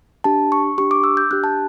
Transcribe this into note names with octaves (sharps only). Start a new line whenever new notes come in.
D4 G4 A5
C#6
D4 G4 C#6
D6
E6
G6
D4 G4 F#6
A5